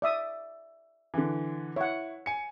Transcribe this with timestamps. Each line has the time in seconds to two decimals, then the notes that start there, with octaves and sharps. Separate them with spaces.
0.02 D5 E5 D#6
1.14 D3 E3
1.76 E4 C#5 F#5
2.26 G#5 C#7